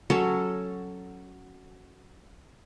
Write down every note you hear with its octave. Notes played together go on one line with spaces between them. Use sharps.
F#3 C#4 A4